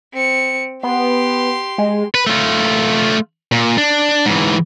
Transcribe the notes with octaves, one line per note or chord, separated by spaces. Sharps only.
C4 C#7
B3 G4 C6
G#3
B4
A3 F4
A#2
D4
G#2 E3